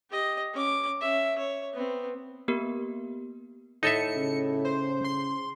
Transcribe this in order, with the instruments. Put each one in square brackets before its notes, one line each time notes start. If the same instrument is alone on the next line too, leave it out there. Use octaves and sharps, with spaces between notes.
[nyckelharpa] G4 D#5
C#4 D6
C#4 E5
C#5
B3 C4
[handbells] A#3 B3 G4 A#4
[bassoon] A2 [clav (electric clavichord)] D#4 A4 E5 [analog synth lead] C#7
[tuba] C#3
[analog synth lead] C5
C6